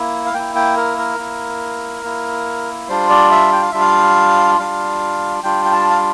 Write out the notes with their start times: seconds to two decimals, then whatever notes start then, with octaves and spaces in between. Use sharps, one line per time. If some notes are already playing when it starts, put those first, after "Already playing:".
Already playing: A#3 E4
0.26 F5
0.34 A#3 E4 G5
0.56 G5
0.77 A#4
0.98 A#4
1.18 A#3 E4
2.03 A#3 E4
2.89 G3 D4 F4 C5
3.10 D5
3.31 E5
3.53 G5
3.62 F5
3.71 G3 D4 F4 E5
3.81 F5
4.59 G3 D4 F4 F5
5.43 G3 D4 F4 G5
5.65 G5
5.72 A5
5.90 F5